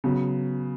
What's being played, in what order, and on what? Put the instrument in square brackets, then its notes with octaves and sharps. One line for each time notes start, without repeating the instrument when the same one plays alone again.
[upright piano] C#3 F#3 B3